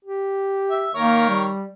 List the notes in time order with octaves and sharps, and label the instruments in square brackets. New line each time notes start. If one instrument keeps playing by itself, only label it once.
[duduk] G4
[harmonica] E5
[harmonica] D#3 A#4 C#5 [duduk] A#3
[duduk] G3